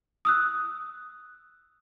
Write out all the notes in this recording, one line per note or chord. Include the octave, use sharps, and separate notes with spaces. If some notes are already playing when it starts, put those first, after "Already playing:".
D#6 E6 F#6